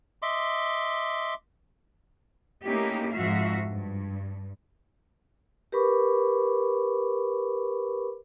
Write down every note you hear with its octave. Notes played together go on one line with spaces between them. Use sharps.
D#5 E5 C6 D6
A3 A#3 C#4 D#4 E4 G4
F2 G#2 F3 F#4 E5 F5
G2
G4 A#4 B4 B5 C#6 D6